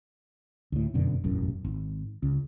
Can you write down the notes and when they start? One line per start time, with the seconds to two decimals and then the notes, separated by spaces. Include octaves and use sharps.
0.72 D2 A2
0.94 F1 F#2 B2 D3
1.24 E1 A1 F#2
1.65 G#1
2.23 C#2